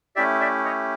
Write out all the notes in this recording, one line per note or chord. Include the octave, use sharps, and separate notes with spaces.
A3 C#4 E4 G4 D5 E5
D5 E5
C#5 D#5